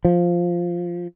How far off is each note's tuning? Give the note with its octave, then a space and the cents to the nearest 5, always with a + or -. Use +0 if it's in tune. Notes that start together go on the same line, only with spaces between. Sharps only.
F3 +0